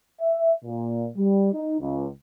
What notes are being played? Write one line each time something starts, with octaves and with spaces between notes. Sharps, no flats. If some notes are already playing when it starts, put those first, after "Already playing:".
E5
A#2
G3
D#4
C#2